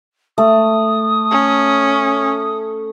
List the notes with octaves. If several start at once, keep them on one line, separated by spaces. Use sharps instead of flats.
A3 D#6
C#4